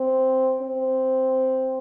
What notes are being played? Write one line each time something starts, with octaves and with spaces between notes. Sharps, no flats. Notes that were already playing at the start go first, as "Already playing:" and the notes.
Already playing: C4
C4